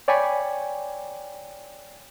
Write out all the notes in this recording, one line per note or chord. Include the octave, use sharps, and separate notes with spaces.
C#5 D5 G5 G#5 B5 C#6